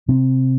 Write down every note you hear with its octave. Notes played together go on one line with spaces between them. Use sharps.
C3 C4